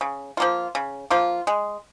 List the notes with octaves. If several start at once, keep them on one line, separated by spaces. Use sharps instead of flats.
C#3
F3 A#3 F4
C#3
F3 A#3 F4
G#3